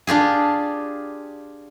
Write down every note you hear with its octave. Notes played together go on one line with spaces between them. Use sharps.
D4 F4 G4 G#4